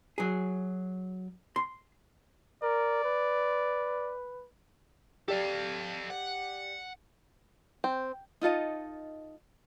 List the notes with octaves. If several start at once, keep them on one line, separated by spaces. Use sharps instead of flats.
F#3 G#4
C6
A#4 D5
B4
G4 A4 D5 F5
F#5
C4
D#4 F4 A4 D#5